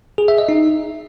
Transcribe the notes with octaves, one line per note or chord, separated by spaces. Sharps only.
G#4
E5
D#5
D#4